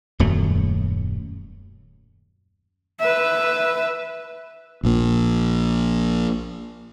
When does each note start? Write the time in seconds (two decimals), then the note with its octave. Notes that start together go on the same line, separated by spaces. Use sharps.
0.19 D#1 F#2 F#3 A3
3.00 B4 E5
4.83 A#1 A#2